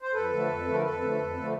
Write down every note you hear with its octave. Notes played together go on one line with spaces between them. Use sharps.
C5
F2 A4 B4
D3 F3 A3
F2
D3 F3 A3
A#4
F2 A4 B4
D3 F3 A3
F2
D3 F3 A3